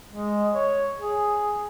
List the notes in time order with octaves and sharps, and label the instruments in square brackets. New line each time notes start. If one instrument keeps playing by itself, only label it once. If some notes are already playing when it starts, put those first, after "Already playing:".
[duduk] G#3
C#5
G#4